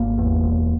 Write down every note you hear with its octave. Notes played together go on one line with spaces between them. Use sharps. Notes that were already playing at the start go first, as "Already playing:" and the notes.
Already playing: G#1 A#3
E2
E1